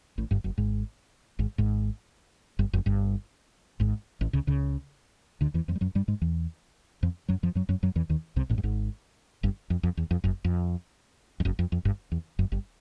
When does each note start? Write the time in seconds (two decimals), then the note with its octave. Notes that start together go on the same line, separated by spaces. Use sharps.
0.18 A1 A2
0.31 G1 G2
0.44 F#1 F#2
0.58 G#1 G#2
1.39 G#1 G#2
1.58 G#1 G#2
2.59 G1 G2
2.73 F#1 F#2
2.86 G1 G2
3.80 G#1 G#2
4.21 A1 A2
4.33 C#2 C#3
4.47 C#2 C#3
5.41 D2 D3
5.54 E2 E3
5.68 F2 F3
5.76 G3
5.81 F#2 F#3
5.95 G2 G3
6.08 G#2 G#3
6.22 E2 E3
7.03 F2 F3
7.28 F#2 F#3
7.43 F2 F3
7.55 F#2 F#3
7.69 F#2 F#3
7.83 F#2 F#3
7.96 E2 E3
8.09 D#2 D#3
8.36 C2 C3
8.50 A1 A2
8.58 G2
8.63 G#1 G#2
9.43 G1 G2
9.70 F2
9.83 F2
9.97 E2
10.11 F2
10.24 F#1 F#2
10.45 F2
11.40 F2
11.45 F#1 F#2
11.59 F2
11.72 F2
11.85 G1 G2
12.12 E2
12.39 F#1 F#2
12.52 G1 G2